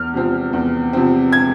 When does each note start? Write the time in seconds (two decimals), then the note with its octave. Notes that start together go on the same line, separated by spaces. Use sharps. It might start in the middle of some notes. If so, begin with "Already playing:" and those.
Already playing: E2 F6
0.13 C3 F3 C4
0.53 E2
0.93 C3 F3 C4
1.33 G#6